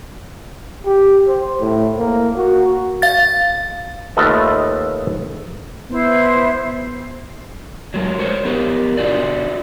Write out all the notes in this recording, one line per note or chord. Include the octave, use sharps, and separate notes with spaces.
G4
C5
A2
A#3
F#4
F5 A6
D#2 A3 F4 A4 B4 D#5
B3 E4 C5
F#3 G#3 A#4
A#4 C5 C#5
B3 G4 A#4
D4 F4 F#4 D5